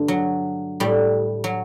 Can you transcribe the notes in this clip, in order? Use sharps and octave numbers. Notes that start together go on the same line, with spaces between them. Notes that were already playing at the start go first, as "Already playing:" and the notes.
Already playing: G2 D3 A3
F#3
A2 G3
F#3